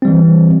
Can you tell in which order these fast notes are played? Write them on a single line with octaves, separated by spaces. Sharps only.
C4 G3 E3